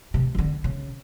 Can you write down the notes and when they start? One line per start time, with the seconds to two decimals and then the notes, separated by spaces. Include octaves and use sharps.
0.14 C3
0.35 D#3
0.38 D3
0.64 C#3